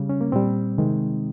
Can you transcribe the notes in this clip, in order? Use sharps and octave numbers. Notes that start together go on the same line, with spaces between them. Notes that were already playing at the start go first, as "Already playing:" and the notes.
Already playing: C#3 G3
C#4
A#3
A#2 G3 C4
C3 D#3 G#3